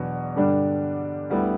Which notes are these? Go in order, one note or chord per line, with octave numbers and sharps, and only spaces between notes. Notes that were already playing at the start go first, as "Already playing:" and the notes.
Already playing: E2 B2 F#3 B3 D4
G2 D3 G3 D4
D2 D3 G3 B3 E4